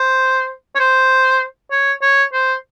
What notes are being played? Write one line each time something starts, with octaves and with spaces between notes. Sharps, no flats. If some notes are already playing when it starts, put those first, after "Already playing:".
Already playing: C5
C#5
C5
C#5
C#5
C5